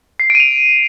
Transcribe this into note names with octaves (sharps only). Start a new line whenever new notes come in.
C7
D7 D#7
F7